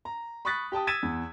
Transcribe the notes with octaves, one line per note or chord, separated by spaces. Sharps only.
A#5
B5 C#6 D#6 F#6 A6 B6
G4 G5 A5 D#6
E6 G#6 A6 B6 D#7 E7
E2